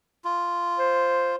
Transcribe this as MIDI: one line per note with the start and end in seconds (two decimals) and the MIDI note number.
0.25 1.36 65
0.79 1.36 72